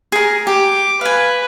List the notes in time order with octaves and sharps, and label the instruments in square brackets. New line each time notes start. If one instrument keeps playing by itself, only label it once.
[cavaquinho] G#4 A#4
[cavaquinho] G4 [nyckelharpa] D6
[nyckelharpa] B4 [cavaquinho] F5 G#5